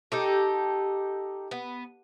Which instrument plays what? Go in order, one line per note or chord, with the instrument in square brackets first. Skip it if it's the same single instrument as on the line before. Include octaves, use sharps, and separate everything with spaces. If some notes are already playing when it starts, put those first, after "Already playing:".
[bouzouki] D#4 G4 A4
B3